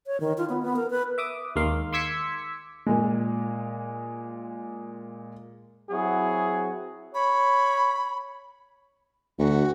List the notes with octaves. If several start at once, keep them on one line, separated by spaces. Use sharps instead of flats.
C#5
D#3
F4
B3
B3
A#4
B4
E5 D6 D#6
D#2 G#3 A#3 F5 C6
C6 D6 E6 G#6 B6 C#7
A#2 G#3
F#3 C4 E4 F#4 G#4
C#5 B5
D2 F#4